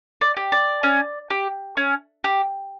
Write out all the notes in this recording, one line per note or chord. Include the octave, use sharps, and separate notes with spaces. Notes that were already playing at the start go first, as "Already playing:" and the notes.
D5
G4
D5
C#4
G4
C#4
G4